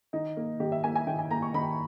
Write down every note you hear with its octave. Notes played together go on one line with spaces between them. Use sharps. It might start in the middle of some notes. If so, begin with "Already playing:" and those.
D#3 D#4
A#3
D#3 G4
E5
A#3 G#5
G#5
D#3 G5
G#5
A#3 A#5
C#6
D#3 B5